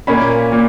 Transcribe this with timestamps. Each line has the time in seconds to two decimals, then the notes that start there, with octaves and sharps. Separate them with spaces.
0.07 A#2 A#3 C#4 B5
0.52 A#2